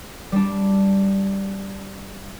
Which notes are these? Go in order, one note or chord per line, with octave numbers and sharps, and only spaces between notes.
G3 D4